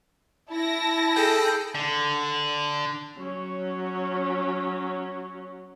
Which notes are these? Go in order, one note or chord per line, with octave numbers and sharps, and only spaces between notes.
E4 A5 A#6
G#4 A4 G5
D3
F#3 C#4